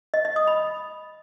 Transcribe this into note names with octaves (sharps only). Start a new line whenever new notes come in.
D#5
D#5
D#6
B5